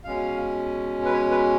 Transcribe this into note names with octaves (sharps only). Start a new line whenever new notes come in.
B2 G#3 C#4 F5
B4
C#5
B4